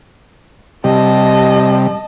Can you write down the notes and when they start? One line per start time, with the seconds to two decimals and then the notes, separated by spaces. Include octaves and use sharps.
0.84 C3 G3 D#5 A5